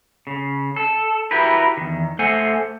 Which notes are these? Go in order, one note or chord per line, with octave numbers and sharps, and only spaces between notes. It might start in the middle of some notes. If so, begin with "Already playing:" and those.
C#3
A4
E4 F#4 G4 A#4 B4
E2 D#3
A3 A4 C5 F#5 G#5